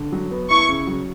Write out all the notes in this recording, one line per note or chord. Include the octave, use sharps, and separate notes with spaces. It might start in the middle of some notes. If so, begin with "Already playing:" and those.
Already playing: D3
F#3
B3
E4 C#6
C#3
F#3